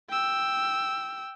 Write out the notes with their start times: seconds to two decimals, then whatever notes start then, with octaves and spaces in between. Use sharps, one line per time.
0.10 G5 E6